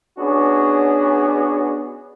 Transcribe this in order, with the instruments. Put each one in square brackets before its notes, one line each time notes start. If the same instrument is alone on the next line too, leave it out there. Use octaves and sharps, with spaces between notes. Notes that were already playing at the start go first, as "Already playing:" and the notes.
[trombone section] B3 C#4 D4 F#4 G#4